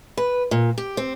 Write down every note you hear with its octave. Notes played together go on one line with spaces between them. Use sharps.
B4
A#2
G4
C4